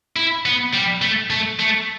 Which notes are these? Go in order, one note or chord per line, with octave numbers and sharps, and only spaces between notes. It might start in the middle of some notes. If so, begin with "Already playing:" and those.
E4
B3
G3
A3
A3
A3